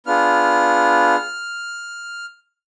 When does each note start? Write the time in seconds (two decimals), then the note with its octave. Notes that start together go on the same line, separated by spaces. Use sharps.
0.06 B3 D4 F4 G#4 F6